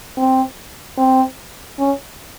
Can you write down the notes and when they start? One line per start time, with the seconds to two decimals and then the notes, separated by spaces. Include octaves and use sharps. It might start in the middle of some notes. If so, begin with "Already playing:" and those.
0.17 C4
0.98 C4
1.79 C#4